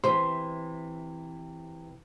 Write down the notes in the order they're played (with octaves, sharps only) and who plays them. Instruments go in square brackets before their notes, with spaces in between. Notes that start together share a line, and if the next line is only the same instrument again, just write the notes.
[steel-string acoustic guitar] C3 E3 [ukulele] C5